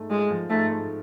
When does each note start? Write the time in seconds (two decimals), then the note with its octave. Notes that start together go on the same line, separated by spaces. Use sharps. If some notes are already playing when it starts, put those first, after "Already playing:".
Already playing: G#2 A3
0.10 G#3 F4
0.31 F3
0.50 G#2 A3
0.71 A3